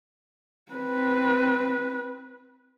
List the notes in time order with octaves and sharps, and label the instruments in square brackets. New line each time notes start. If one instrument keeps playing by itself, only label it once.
[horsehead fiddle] C4 B4